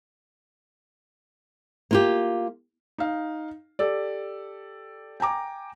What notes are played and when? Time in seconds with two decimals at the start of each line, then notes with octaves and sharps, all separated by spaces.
1.91 A#3 F4 G4
2.98 D#4 F5
3.79 G4 A4 D5
5.20 G5 G#5 A#5 D6